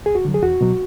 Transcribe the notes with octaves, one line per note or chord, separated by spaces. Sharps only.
D2 G#4
F#4
D3 F#3
G#4
E2 F#4
B2 F#3